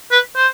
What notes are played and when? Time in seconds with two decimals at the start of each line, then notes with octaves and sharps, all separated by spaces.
0.11 B4
0.36 C5